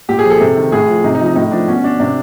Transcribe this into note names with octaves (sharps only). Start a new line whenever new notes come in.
A#2 G4
G#4
F3
A4
C3
D#3
A2 G#4
F3
C3 D#4
D#4
F3
D#4
A2 D#4
F3 D4
B2 C#4
D4
C3 D4